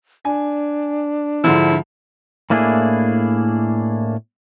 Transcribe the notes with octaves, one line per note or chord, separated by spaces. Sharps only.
D4 G#5
G#2 D3 F3 E4
A2 A#3 D4 E4 F4 G#4